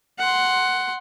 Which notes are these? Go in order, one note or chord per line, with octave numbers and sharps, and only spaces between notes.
F#5 C6